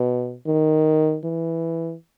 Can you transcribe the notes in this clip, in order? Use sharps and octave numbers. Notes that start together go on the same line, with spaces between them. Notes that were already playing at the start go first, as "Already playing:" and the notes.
Already playing: B2
D#3
E3